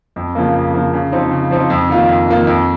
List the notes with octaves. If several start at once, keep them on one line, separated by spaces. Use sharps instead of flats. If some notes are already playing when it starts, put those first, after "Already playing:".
F2
C#3 F3 A#3
F2
C#3 F3 A#3
C#3
F3 C4 D#4
C#3
F3 C4 D#4
F2
D#3 A#3 F4
F2
D#3 A#3 F4
F2